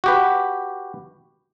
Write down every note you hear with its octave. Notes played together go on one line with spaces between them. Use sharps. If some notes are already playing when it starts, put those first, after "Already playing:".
F#4 G4 B4